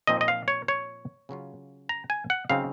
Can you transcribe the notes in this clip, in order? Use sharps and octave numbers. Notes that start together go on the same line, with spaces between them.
A#2 F3 C4 D#4 D#5
D#5
F5
C#5
C#5
C#3 F#3 C#4 F4
A#5
G#5
F#5
C#3 F#3 C4 D#4 F5